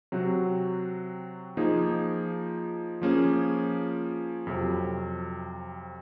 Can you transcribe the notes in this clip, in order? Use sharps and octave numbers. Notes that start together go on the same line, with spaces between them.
C3 F#3 C4 F#4
F3 A#3 D#4 G#4
F3 A#3 C#4 G#4
F2 C3 F#3